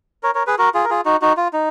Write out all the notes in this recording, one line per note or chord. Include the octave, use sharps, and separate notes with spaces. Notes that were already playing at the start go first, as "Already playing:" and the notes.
A#4 C#5
A#4 C#5
G#4 B4
F#4 A#4
F4 G#4
A#4
F4 G#4
D#4 F#4
D#4 F#4
F4
D#4